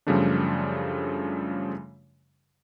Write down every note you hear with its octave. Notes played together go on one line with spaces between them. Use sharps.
F#2 C#3 F3 G3 A3 D4